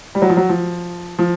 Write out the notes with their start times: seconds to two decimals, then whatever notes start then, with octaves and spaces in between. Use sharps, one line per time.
0.15 G3
0.22 F#3
0.29 F3
0.37 F#3
0.49 F3
1.19 F3